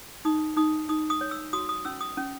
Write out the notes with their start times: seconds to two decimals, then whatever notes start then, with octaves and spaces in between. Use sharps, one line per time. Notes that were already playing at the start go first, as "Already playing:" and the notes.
0.25 D#4 D#6
0.57 D#4 D#6
0.89 D#4 D#6
1.10 D#6
1.21 C#5
1.31 E6
1.53 F#4 D#6
1.69 D#6
1.85 C#4 E6
2.01 D#6
2.17 C#4